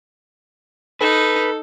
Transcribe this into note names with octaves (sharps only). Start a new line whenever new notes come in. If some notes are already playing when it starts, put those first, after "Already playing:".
D#4 A4 B4